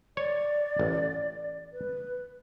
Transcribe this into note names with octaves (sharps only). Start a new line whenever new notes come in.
C#5 D5
A1
B4